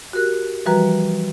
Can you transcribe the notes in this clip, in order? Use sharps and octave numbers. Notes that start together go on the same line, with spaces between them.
F#4 G4 A#4 F#6
E3 F3 G3 F#4 B4 A#5